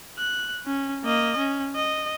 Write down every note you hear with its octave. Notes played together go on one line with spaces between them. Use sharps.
F#6
C#4
A#3 D#5
C#4
D#5